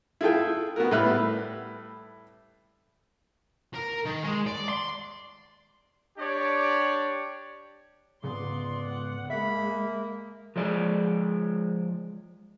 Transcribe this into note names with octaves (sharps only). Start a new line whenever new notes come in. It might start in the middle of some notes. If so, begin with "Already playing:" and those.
E4 F4 G#4 A4 G5
B3 F#4 A#4
A2 G3 A3 B4 E5 F6
A#4
D#3
G#3
D5
C6
D4 G4 C#5 D5
C#2 G#2 B3 F4 A4 D5 C6
F#5
G#3 A#3 E5 B5
F3 G#3 D5